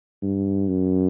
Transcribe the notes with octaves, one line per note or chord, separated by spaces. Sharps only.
G2
F#2